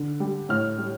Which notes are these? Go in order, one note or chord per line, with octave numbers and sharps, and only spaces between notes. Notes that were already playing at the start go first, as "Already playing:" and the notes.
Already playing: D3
G3
A2 F6
G3